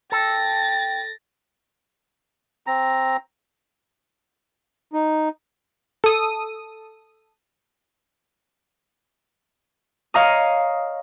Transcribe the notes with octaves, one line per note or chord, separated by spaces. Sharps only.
A4 G5 A6 A#6
C4 A#5
D#4
A4 D#6
C#5 D#5 F5 A#5 D#6